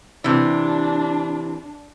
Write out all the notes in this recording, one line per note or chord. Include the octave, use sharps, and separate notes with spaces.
C3 E3 D4